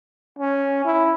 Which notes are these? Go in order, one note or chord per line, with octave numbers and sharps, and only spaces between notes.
C#4
E4